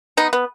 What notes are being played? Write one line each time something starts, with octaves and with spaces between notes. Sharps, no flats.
B3 D#4
B3